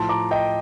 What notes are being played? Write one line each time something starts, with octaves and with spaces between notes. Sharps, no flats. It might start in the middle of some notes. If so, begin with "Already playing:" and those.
Already playing: A2 F3 A5 C6
A#5 D6
D#5 G5